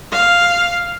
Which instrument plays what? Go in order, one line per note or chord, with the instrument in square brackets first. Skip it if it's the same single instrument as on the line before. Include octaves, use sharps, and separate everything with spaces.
[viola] F5